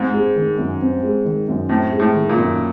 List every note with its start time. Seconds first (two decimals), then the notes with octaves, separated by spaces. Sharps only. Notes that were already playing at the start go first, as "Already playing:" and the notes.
Already playing: G#2 C4
0.14 G#3
0.36 D#3
0.58 F#2
0.81 C4
1.03 G#3
1.25 D#3
1.48 F#2
1.69 A2 C4
1.92 G#3
2.00 A2
2.14 D#3
2.29 A#2
2.37 F#2